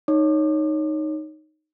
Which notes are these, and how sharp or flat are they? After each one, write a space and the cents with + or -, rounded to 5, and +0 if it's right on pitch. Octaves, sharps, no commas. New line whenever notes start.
D#4 -5 C#5 +0 D6 +40